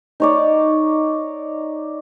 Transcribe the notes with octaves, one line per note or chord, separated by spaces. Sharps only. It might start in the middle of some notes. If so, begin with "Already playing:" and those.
D#4 C#5 D5